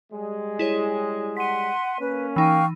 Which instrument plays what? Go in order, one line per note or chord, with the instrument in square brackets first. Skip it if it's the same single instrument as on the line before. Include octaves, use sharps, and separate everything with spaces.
[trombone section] G3 G#3
[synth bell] E4 G#4 C#5
[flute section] F#5 C6 [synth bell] B6 D#7
[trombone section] A#3 C#4 [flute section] B4
[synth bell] E3 D#4 [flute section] F5 G5 C#6